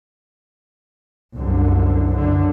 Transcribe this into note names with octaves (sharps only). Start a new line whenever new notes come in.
C2 F#2 D3
F#2 D3